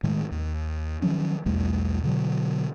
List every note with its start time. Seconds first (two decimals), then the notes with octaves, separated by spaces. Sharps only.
0.03 A2 D#3 G#3
0.31 D#2
1.02 D#3 F3 F#3 C#4
1.46 B1 E2 G3 A3
2.03 B2 D3 F#3